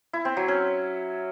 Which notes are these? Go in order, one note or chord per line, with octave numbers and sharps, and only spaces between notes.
E4
C4
F#3
C#4